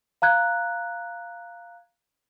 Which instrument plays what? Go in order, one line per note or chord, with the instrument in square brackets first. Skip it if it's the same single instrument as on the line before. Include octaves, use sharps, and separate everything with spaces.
[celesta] F5 A#5 F#6 G#6